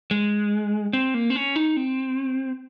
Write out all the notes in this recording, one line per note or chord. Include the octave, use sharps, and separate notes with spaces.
G#3
C4
A#3
C4
C#4
D#4
C4